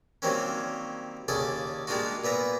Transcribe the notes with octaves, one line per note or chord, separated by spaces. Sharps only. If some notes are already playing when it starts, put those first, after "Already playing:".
D#3 F#3 G3 A#3 C4 C#4
D#2 C#3 G#4 A4 D5
G3 G#3 A#3 D4 F4 F#4
A#2 B3 E5 A#5